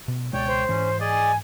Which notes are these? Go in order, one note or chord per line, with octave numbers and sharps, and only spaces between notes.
B2
C#2 B2 G#3 C#5 D5 G5
C5
G#2 E3 C#4
G#4 D5 D#5 G#5